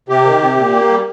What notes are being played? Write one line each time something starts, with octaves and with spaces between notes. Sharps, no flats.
C3 G4
D#3
C3
A#2
A#3
G3